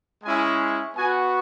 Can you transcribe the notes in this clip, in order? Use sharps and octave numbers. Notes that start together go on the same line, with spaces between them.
G#3 C#4 E4 G#5
B3 F#4 G#5